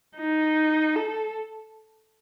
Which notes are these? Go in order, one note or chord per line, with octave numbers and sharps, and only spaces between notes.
D#4
A4